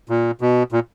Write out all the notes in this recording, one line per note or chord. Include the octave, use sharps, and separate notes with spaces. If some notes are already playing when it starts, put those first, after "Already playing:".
A#2
B2
A#2